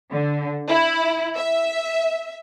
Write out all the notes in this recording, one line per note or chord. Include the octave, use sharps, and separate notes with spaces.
D3
E4
E5